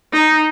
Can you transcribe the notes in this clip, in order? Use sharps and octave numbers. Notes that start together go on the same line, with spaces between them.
D#4